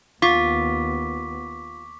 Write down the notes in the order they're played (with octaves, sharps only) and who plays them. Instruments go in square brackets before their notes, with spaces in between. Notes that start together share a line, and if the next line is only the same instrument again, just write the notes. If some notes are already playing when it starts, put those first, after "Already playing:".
[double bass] D#2 B3 [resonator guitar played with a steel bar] F4 [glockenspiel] C#6 D6 B6